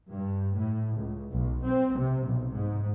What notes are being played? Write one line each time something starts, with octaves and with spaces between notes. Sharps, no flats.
G2
A2
C#2
B1
C4
C3
B1
G#2